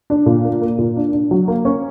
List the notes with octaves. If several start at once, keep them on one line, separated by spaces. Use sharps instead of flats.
D4
A#2
A#3
A#3
A#2
D4
D4
F#3
A#3
C#4